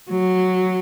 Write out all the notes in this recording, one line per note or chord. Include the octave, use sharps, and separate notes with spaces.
F#3